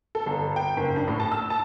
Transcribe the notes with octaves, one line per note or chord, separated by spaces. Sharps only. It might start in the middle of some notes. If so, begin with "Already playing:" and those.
A4
G1
G5
F#1
D4
A2
A5
E6
A5